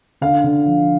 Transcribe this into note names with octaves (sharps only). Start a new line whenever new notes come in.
D3 F5
D3
F3